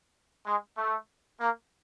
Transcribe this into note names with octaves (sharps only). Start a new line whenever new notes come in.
G#3
A3
A#3